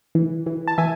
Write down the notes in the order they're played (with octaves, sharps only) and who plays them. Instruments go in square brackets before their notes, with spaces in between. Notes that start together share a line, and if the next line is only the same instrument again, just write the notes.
[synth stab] E3
E3
A5
E3 E5 G#5